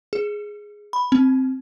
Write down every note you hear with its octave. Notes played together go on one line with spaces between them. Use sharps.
G#4
B5
C4